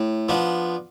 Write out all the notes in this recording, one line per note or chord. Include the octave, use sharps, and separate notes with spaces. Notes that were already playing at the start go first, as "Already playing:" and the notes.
Already playing: A2
F3 B3 D4